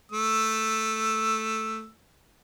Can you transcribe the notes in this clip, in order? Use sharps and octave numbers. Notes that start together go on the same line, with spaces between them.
A3 E6